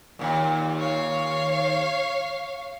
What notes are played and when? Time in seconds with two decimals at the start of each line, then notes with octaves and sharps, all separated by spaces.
0.19 D#2 A#2
0.79 C#5 F5